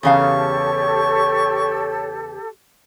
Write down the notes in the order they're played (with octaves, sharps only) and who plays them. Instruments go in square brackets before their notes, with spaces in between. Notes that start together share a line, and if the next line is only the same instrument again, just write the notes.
[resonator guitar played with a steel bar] E2 C#3 F5 [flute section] G4 A4 [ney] C#5 [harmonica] C#6